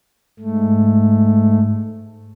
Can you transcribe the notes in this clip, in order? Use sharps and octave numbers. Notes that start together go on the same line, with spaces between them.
G#2 A3